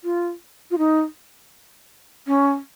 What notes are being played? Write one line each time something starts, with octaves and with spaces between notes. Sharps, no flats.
F4
F4
D#4
C#4